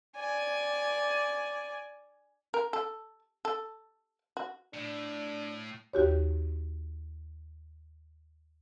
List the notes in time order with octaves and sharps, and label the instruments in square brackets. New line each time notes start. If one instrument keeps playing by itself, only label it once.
[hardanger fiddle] D5 G#5
[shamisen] A#4
A4
A4
F#4
[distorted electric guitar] A2 [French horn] D4
[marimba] D#2 F#4 G4 C#5